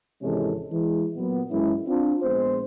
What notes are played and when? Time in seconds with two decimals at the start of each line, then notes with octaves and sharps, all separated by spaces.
0.22 G#1 C3 E3 G#3 C#4 A4
0.71 E3 G#3
1.16 A#2 F#3 B3
1.50 F#2 E3 G#3 C#4 E4
1.87 C4 D4 F4
2.22 A#1 G#3 B3 C5